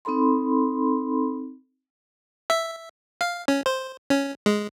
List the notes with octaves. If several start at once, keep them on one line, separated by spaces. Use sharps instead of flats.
C4 D#4 A4 B5 C6
E5
F5
C#4
C5
C#4
G#3